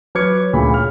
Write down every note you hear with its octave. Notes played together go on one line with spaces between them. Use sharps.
F#3 B4 D6 F6 G#6 C#7
D2 A#2 C#3 B5
F6